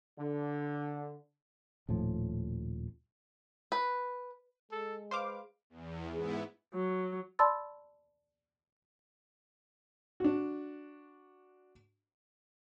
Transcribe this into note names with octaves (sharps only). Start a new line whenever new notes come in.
D3
D#1 A2 F3
B4
G#3 A4
B4 C5 F5 D6
E2
G#2 B3 E4 G#4
F#3
D5 A5 B5 C6 E6 A6
D4 F#4